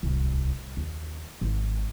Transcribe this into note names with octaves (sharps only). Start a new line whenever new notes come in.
D1 C2
D#2
G#1